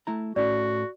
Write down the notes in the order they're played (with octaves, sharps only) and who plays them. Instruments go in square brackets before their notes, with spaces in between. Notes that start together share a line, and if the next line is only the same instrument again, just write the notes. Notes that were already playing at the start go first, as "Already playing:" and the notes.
[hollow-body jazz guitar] A3 E4 A#5
[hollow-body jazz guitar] A2 C#4 E4 [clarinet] F#4 [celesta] D5